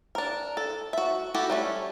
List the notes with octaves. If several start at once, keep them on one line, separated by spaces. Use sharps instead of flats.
D4 A#4
A4
F#4 E5
E4 F#4 G4 A4
G3 A3 C#4